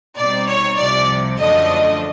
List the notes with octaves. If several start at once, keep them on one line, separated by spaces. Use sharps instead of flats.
B2 G3 C4 D#4 D5
C#5
C2 C3 F3 D5
F#2 D3 F3 A3 D4 D#5